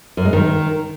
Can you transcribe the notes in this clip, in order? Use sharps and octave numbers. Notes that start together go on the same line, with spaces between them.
F#2
G#3
D#3